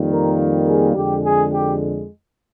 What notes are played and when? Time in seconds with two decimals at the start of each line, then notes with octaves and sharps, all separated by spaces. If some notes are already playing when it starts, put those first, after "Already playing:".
Already playing: F2 D#3 G3 A#3
0.11 A#4
0.68 G#4
0.96 F2 D3 G#3 G4
1.24 G#4
1.52 G4